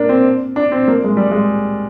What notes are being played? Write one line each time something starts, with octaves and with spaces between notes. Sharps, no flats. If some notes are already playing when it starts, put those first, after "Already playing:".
Already playing: A#3 D4
C4
D4
C4
A#3
G#3
G3
G#3